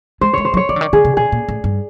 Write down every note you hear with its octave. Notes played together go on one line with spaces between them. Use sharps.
G#3 C5
G#3 C#5
C5
F#3
C#5
F3 D5
D3
D#3
D3 G#4
C3
B2 G#4
A#2
A2
G2